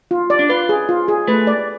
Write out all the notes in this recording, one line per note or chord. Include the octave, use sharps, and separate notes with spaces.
F4
D5
D4
F4 B4
G#4
F4
G#4
A3 B4
D5